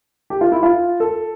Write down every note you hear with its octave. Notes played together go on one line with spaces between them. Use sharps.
G4
F4
E4
F4
A4